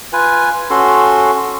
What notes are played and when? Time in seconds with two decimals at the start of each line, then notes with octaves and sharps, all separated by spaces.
0.13 F4 B4 G#5
0.70 C#4 F#4 A4 C6